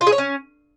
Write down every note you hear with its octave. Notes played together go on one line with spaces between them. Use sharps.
F4
G#4
C#5
C#4